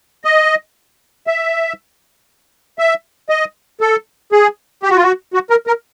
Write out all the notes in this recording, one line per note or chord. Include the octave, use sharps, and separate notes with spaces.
D#5
E5
E5
D#5
A4
G#4
G4
F#4
F4
F#4
F#4
A#4
A#4